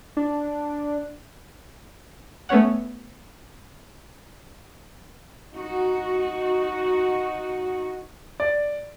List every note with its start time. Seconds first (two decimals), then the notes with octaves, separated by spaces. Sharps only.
0.17 D4
2.49 A3 B3 C#4 C#5 F#5
5.54 D#4 F#4
8.40 D5